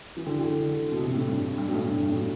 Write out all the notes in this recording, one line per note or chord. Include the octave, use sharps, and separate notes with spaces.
E3
D3
D3
B2
C3
A2
G2
G2
B2
A2
G2
G2
A2
B2